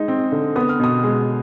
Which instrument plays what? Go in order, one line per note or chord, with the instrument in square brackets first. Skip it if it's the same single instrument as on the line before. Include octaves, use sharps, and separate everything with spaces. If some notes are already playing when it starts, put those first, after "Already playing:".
Already playing: [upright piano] G#3 D#4
C4
D3
B3 D#6
F6
B2 D#6
G#3